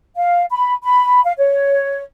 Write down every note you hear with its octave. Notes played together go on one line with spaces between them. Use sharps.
F5
B5
B5
F5
C#5